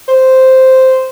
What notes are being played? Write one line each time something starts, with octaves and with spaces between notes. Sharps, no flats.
C5